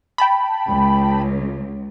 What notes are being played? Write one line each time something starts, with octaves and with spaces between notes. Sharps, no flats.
G5 A5 B5
C#2